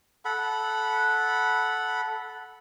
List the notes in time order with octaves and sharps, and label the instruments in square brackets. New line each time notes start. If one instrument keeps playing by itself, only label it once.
[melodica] A4 F#5 B5